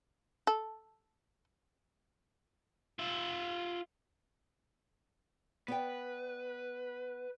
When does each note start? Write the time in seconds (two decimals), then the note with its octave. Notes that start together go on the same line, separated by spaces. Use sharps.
0.47 A4
2.99 F4 E5
5.68 B3 B4 D5 G5